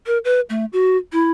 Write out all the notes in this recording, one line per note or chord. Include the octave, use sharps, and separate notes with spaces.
A#4
B4
A3
F#4
E4